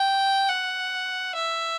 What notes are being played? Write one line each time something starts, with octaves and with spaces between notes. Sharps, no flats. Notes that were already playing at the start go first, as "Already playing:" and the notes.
Already playing: G5
F#5
E5